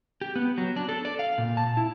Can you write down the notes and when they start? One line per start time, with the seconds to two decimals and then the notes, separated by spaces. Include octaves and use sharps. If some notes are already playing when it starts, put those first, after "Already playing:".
0.21 G4
0.36 B3
0.58 F#3
0.76 D4
0.89 A4
1.05 D5
1.19 F5
1.38 A#2
1.57 A5
1.77 E4